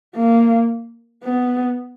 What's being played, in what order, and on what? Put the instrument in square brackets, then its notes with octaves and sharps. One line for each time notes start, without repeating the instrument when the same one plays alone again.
[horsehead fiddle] A#3
B3